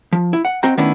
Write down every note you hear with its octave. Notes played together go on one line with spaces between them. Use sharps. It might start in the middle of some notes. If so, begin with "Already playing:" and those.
F3
E4
F#5
C4 F#4 D#5 G5 A#5
D#3 A3 B3 C#4 D4 E4